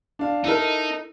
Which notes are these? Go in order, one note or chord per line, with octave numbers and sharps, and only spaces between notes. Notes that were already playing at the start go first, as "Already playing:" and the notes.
D4 F5
D#4 E4 A4 A#4